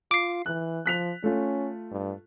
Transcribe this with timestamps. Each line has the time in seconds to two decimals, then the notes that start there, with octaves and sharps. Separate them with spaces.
0.11 F4 D6 C7
0.46 E3 F#6
0.86 F3 F#6 B6 F7
1.24 A3 C#4 F4
1.91 G2